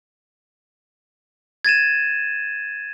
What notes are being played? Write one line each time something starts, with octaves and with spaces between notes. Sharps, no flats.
G#6 A6 D#7 E7